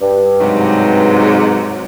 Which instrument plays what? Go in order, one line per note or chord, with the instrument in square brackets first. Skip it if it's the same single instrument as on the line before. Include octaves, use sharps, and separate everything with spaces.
[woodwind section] G2
[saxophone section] G#2 C3 F#3